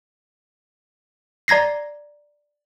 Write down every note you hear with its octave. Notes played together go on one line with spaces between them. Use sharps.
D5 A#5 G#6 A#6 C7